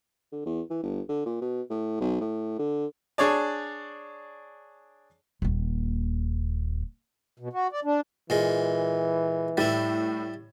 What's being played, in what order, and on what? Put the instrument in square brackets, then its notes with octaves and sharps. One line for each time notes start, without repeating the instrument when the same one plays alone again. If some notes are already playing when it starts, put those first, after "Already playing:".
[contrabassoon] D3
E2
E3
G1
D3
A#2
B2
A2
B1
A2
D3
[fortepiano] D4 G#4 C#5 D5
[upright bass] D#1 D#2
[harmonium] B2
F#4
D5
D4
[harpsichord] A#2 G#3 [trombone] E3
[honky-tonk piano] A2 [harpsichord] G3 E4